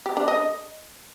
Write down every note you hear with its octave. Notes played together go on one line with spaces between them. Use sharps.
G4
D4
D#5